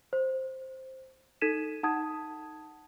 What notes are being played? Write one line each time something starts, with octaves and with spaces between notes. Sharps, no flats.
C5
D#4 A4 G#6 B6 D#7 E7
D#4 F#5 A5 D#6 G#6